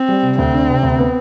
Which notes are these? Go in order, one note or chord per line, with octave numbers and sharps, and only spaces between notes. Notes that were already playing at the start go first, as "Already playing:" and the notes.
Already playing: C4
G3
C3
D2 C4
D4
C3
D2
B3